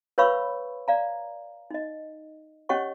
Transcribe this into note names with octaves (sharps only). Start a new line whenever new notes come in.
B4 C#5 F5 B5 C#6 E6
D5 F5 A#5
D#4 D#5
C#4 G4 C#5 D#5 F#5 C#6